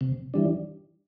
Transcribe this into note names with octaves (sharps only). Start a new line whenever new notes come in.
C3
E3 G3 D4